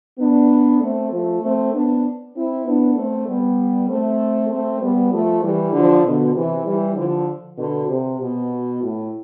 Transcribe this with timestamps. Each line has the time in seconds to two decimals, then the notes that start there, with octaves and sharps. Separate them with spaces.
0.19 B3 D4
0.81 A3 C4
1.12 F3 A3
1.42 A3 C4
1.73 B3 D4
2.35 C4 E4
2.66 B3 D4
2.96 A3 C4
3.27 G3 B3
3.88 A3 C4
4.51 A3 C4
4.81 G3 B3
5.12 F3 A3
5.42 E3 G3
5.73 D3 F3
6.04 B2 D3
6.34 C3 E3
6.65 E3 G3
6.96 D3 F3
7.58 B2 D3
7.88 C3
8.19 B2
8.81 A2